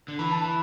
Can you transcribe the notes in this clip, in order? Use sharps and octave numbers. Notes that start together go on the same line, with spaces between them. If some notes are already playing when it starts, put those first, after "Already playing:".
D3
E3 B5
A5
B5